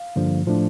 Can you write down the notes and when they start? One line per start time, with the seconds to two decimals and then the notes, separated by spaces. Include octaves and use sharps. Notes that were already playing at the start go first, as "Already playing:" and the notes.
Already playing: F5
0.16 G2 D3 F3 A#3
0.47 A2 F3 A3 D4